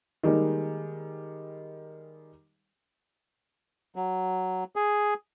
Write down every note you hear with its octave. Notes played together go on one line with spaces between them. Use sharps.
D#3 G3 G#3 A#3 D#4
F#3
G#4